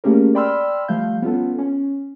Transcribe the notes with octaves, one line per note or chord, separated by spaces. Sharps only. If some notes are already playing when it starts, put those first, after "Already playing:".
A3 A#3 C#4 G4 G#4 A#4
D5 G5 B5 C6 E6 F6
F3 G3 A3 F5 G6
B3 C#4 F4 A4
C#4